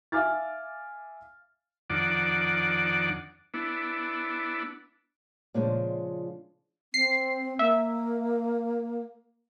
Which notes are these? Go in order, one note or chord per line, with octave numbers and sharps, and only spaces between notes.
E5 F5 G#5 D6 F6 A6
F2 D#3 D4 D5 F#5
B3 D4 E4
A#2 C#3 F3 G#3 D4
C4 C7
A#3 E5